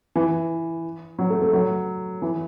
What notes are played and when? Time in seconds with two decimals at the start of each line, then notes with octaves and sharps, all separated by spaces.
0.16 E3
1.19 F#3
1.30 A3
1.42 A3
1.53 F#3
2.22 E3